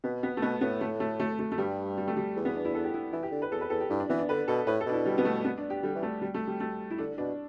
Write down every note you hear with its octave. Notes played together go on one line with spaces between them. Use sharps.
B2 B3
B3
A3
B2 B3
A2 B3
A3
A3
A3
A3
A3
G2 G3
G3
A3
G3
E2
B3
D4
E4
A4
G4
E4
E3 E4
G4
D3
B4
E2 A4
B4
E2 A4
G4
G2 E4
D4
E3 B3
D4
D3 B4
B2 A4
A2 B4
A4
B2 D4
E4
G3
B3
A3
B3
D4
G4
D3 G3
E3
A3
G3
A3
G3
A3
E4
D3 D4
B2 D4